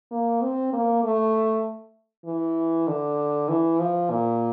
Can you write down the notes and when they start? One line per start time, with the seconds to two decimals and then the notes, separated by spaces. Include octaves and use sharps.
0.11 A#3
0.42 C4
0.73 A#3
1.04 A3
2.25 E3
2.88 D3
3.49 E3
3.80 F3
4.10 A#2